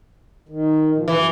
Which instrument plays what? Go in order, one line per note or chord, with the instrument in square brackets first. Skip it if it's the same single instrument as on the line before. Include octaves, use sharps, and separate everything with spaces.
[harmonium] D#3
A#2 F3
[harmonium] F#2 [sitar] E3